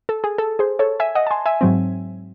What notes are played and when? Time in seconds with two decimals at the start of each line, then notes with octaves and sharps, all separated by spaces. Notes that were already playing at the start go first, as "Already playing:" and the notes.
0.09 A4
0.24 G#4
0.38 A4
0.59 G#4 C5
0.79 A4 C#5
1.00 E5 G#5
1.15 D#5 F#5
1.27 A5
1.31 G#5 C6
1.46 E5 G#5
1.61 G#2 F#3 C4